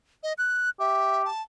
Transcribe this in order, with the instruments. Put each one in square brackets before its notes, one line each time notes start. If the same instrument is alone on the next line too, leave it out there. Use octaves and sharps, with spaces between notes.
[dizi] D#5
F#6
[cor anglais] G4 [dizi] E5
[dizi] A5